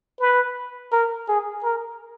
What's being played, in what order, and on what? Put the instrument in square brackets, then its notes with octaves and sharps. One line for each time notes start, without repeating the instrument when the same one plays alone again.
[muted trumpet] B4
A#4
G#4
A#4